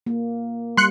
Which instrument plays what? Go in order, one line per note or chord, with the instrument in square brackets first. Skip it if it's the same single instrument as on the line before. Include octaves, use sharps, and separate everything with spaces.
[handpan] A#3
[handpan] G3 [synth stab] C6 F#6 C#7